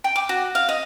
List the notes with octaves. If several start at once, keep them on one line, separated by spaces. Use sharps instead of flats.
G5
D6
F#4
F5
D#5